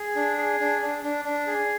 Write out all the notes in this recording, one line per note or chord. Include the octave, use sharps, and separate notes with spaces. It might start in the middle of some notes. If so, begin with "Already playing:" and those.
Already playing: G#4
D4
G#4
D4
D4
D4
D4
G#4